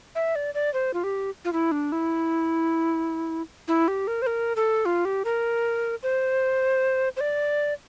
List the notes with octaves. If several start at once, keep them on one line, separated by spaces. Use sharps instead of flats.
E5
D5
D5
C5
F4
G4
F4
E4
D4
E4
E4
G4
A#4
C5
A#4
A4
F4
G4
A#4
C5
C5
D5